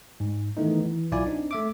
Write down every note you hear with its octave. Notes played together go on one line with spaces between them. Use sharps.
G#2
D#3 E3 A3 B3 D#4
E3
B1 E4 F4 D5 G#5
C4 D4 D#4
A3 E5 D6